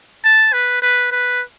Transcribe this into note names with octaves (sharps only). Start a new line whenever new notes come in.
A5
B4
B4
B4